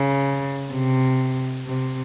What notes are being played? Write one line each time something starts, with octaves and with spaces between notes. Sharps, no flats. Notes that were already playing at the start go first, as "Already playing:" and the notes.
Already playing: C#3
C3
C3